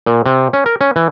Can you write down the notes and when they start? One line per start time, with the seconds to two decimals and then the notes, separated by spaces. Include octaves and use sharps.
0.06 A#2
0.26 C3
0.53 C#4
0.66 A#4
0.81 C#4
0.96 E3